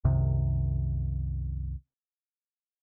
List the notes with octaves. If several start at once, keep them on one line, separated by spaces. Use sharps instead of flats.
C2 F#2 C3 D#3